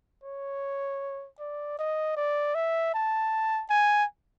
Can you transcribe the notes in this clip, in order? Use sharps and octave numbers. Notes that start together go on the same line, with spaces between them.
C#5
D5
D#5
D5
E5
A5
G#5